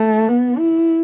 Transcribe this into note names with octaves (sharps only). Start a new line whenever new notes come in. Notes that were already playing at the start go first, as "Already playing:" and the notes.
Already playing: A3
B3
E4